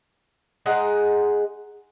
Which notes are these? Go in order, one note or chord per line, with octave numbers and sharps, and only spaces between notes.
G#3 D#4 G#4 F#5